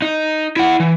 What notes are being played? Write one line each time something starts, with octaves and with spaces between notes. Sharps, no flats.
D#4
E4 F#5
E3